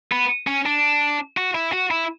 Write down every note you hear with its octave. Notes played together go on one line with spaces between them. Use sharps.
B3
C#4
D4
F#4
E4
F#4
E4